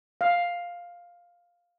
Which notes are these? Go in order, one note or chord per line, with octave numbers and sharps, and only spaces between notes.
F5